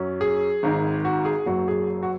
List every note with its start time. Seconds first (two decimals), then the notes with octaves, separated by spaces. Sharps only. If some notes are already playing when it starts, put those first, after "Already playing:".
Already playing: F#2 F#3 C#4
0.21 G#4
0.63 G#1 G#2 D#3
1.05 F#4
1.25 G#4
1.46 F#1 F#2 F#3 F#4
1.68 G#4
2.03 F#4